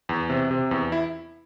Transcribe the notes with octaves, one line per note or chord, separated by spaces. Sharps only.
E2
C3
C3
E2
E4